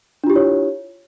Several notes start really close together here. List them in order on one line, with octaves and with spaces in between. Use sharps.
D4 F4 G4 E4 C#5